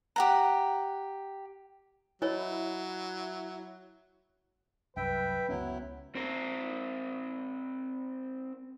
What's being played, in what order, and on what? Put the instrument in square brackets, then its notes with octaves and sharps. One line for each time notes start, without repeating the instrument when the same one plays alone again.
[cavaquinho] G4 F#5 A#5
[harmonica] F#3 [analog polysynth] E4 [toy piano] C#5 D#5
[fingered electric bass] C2 F#2 [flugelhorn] B4 [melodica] E5 G5
[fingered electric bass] C#2 B3 C#4 [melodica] F#3 E4
[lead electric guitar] C4 A#4